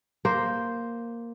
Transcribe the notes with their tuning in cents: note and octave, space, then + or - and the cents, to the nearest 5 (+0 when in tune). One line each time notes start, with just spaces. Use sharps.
A#3 +0 C5 +0